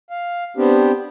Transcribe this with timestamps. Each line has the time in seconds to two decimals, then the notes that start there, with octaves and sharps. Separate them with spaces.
0.10 F5
0.57 B3 C4 D4 G4